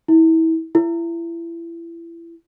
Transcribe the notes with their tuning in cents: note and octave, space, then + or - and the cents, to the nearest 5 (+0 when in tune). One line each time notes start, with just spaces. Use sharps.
E4 -30
E4 +30